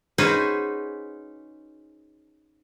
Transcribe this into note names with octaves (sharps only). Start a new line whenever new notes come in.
C#4 D#4 F#4 G#4 B4 C5